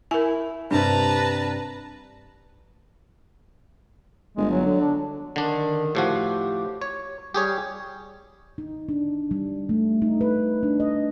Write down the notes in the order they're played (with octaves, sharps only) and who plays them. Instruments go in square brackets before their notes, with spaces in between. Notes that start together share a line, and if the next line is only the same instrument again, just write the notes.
[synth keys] E4 [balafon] A#4 G#5
[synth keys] G2 C3 G3 [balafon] D4 [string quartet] B4 A5 A#5
[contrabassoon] G1 [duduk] G#3
[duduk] F#3
[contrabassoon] D3
[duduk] D4
[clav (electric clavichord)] D3 D4 [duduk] D#3
[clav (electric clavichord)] A2 F3 F#4 [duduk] G4
[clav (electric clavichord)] C#5
[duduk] G3 [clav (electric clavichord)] G4 G#4 C#5
[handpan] D#4
D4
G3
A3
D#4
B4
D4
D#5